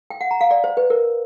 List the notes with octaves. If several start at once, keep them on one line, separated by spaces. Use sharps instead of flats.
G5
F#5
A#5
F5
D5
C5
B4
A#4